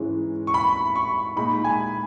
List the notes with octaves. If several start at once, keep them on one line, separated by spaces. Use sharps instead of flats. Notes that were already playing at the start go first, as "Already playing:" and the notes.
Already playing: G#2 E3 G#3 C#4
C#6
B5
C#6
A#2 G#3 D#4 B5
G#5